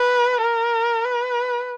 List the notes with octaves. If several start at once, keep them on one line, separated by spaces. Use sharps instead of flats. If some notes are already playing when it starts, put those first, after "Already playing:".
Already playing: B4
A#4
B4